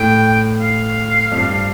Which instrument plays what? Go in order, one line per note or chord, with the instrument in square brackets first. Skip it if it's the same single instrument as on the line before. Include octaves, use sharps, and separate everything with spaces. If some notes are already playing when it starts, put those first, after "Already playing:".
Already playing: [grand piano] A2 [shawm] G5
[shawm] F5
[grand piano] F2
G2